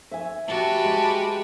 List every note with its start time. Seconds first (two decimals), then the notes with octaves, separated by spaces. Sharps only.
0.11 E5 G#5
0.48 F#4 G4 B4 A5
0.84 G#3